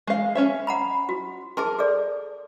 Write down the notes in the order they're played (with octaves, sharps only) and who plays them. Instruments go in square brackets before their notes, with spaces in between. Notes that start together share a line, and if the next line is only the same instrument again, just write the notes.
[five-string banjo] G#3 F5
C#4 C#5 E5
[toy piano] F#5 A#5 B5
F#4
[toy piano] G#4 A5 C6 [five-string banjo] A#4
[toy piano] G#4 A4 D5